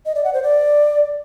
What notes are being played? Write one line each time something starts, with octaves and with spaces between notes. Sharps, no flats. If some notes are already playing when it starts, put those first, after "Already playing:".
D#5
D5
F#5
C5
D5